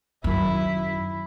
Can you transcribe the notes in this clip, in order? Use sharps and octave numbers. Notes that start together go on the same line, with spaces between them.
F#2 D#3 E4